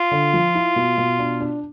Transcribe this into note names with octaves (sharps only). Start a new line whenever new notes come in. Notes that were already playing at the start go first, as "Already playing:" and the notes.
Already playing: F4
D3
F3
E4
B2
B2
D4
D4